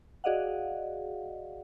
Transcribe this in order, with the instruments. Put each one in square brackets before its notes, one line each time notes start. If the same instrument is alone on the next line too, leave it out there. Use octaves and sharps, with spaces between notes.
[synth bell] F#4 G#4 D5 D#5 F5 F#5